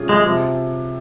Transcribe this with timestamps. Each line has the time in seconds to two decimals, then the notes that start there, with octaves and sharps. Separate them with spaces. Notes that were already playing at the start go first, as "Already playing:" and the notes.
Already playing: C3 G3 C#4 F4 G#4
0.09 G#3
0.24 C3 F3 C4